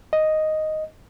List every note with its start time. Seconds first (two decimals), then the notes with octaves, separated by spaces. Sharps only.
0.13 D#5